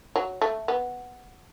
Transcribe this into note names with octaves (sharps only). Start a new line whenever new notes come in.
F#3
A3
B3